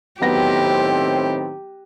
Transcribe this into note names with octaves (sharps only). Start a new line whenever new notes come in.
A2 D#3 F#3 B3 C4 G4 A#6